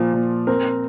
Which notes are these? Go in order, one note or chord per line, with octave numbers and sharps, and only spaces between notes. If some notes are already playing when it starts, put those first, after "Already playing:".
Already playing: A#2 F3
A#2
C4 A#4